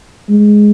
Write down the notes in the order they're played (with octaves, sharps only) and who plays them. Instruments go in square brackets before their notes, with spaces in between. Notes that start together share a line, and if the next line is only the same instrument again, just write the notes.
[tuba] G#3